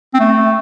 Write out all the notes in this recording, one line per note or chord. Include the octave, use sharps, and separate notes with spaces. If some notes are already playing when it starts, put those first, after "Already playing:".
C4
A3